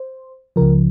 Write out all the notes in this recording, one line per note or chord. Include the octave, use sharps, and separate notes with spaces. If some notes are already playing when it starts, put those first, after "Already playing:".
Already playing: C5
C#2 C#3 F3 A#4